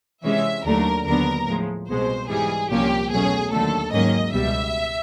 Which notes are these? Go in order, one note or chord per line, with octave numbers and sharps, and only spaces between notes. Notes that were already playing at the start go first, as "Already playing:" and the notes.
C3 E3 G#3 C#4 E5
D#2 D3 F#3 A3 D4 A#4
D#2 D3 F#3 B3 D4 A#4
A2 F3 G#3
C2 B2 G#3 C5
G#2 E3 G3 G#4
C2 A#2 F3 A#3 C#4 G4
E2 B2 F#3 A3 C#4 G#4
D#2 D3 F#3 A3 A4
G#2 D#3 F#3 A#3 C#4 D#5
C#2 B2 G3 E5